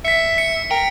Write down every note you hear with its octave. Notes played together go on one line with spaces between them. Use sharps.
E5 B6 C#7
C#7
A#4 G5